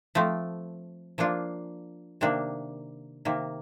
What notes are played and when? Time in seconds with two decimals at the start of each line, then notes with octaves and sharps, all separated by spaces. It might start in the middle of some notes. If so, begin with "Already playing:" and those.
0.15 F3 A3 C4
1.18 F3 A#3 D4 F4
2.21 C3 D#3 A#3 D4
3.25 C3 D#3 A#3